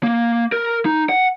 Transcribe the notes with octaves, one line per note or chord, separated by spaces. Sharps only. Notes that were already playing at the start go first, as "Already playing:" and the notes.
A#3
A#4
D#4
F#5